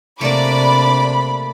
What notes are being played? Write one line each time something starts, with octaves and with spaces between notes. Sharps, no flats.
C3 A3 A#3 D4 D5 B5 D6